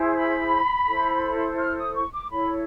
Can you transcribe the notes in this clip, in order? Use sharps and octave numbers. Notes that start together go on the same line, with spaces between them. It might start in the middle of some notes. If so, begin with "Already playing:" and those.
Already playing: E4 G#4 C5
B5
E4 A4 C5
F6
D#6
C#6
D6
E4 A4 C#5 B5